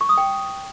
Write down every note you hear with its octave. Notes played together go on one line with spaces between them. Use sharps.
C#6
D#6
G5